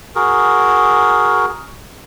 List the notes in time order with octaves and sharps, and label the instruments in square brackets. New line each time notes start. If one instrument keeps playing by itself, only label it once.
[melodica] F#4 G#4 A#4